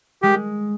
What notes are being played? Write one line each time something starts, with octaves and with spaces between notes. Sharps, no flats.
G#3 G4